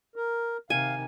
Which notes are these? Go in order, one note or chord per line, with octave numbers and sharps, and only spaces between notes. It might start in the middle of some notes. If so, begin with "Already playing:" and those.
A#4
C3 D#3 F5 G#5